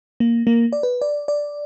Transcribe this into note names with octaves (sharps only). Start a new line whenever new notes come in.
A#3
A#3
D5
B4
D5
D5